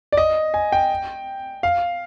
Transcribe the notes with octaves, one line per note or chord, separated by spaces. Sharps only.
D5
D#5
G#5
G5
F5